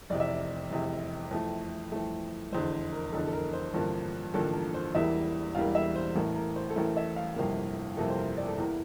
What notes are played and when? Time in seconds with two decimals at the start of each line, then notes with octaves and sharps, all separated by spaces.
0.10 F1 E2 C3 D5
0.20 E5
0.29 D5
0.70 F1 E2 C3
1.31 F2 E3 A3
1.92 F2 E3 A3
2.52 F1 E2 D3 C5
2.72 C5
2.93 A#4
3.13 F1 E2 D3 A4
3.27 A4
3.33 A#4
3.53 C5
3.74 A1 G2 D3 F3 A#3
4.34 A1 G2 D3 F3 A#3 A4
4.54 A#4
4.74 C5
4.95 E1 E2 E3 G3 A#3 E5
5.55 E1 E2 E3 G3 A#3 F5
5.75 E5
5.96 C5
6.15 A1 A2 E3 A3 A#4
6.36 A#4
6.56 C5
6.70 A4
6.76 A1 A2 E3 A3 A#4
6.97 E5
7.16 F5
7.36 G1 F2 C3 E3 A#3
7.97 G1 F2 C3 E3 A#3 A4
8.10 C5
8.17 A#4
8.37 D5
8.48 A4
8.58 E2 E3 A#3 A#4